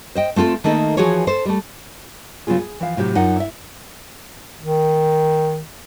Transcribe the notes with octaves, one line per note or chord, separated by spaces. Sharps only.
C5 D#5 G5
A3 C4 F4 A4
D#3 A3 A#3 D#4 G#4 A4
E3 F3 F#4 G#4 C#5
A4 C5
G3 A3
C#3 F#3 B3 F4 G#4
G#4
E3 F3 F5
A2 C3 F#3 G4
F#2 D#4 F4 F#5
E4 E5
D#3